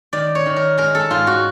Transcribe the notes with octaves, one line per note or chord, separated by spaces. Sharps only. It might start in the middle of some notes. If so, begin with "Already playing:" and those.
D#3 D5
C#5
D#3
A#4
G#3 A#4
A4
G#2 F4
F#4